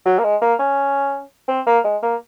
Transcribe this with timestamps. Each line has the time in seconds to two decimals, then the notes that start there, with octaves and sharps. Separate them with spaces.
0.06 F#3
0.19 A#3
0.24 G#3
0.41 A#3
0.59 C#4
1.48 C4
1.67 A#3
1.84 G#3
2.03 A#3